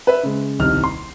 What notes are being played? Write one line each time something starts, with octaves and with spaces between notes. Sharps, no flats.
B4 E5
C#3 G#3
D#1 C2 D#4 F6
C6